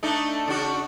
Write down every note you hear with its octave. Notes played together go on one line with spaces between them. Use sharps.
A3 D4 D#4
C#3 D4 F#4